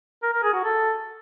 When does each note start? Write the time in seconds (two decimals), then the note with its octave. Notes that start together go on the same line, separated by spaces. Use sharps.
0.23 A#4
0.33 A#4
0.43 G#4
0.54 F#4
0.64 A4